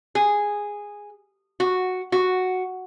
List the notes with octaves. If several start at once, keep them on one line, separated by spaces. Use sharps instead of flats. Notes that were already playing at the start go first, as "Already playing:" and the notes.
G#4
F#4
F#4